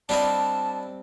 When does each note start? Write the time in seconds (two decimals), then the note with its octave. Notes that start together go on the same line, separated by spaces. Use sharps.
0.09 G3 C4 D4 E4 D#5 F5 A5